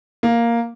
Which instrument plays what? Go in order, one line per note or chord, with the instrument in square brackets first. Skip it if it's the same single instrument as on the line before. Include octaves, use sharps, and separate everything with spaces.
[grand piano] A#3